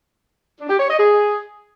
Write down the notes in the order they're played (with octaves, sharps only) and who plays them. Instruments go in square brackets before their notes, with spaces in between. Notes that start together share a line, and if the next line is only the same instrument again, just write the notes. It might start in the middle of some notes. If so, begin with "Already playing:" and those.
[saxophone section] D4
G4
C#5
D#5
G#4